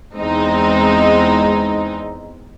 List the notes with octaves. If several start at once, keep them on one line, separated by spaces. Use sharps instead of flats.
E2 G#3 C4 D#4